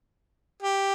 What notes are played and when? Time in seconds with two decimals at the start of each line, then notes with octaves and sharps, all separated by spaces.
0.62 G4